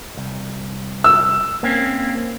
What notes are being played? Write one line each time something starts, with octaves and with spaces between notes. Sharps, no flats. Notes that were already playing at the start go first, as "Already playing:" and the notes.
C2
E6
A#3 C4 C#4